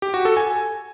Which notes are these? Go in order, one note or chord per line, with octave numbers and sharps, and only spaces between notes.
G4
F#4
A4
G#5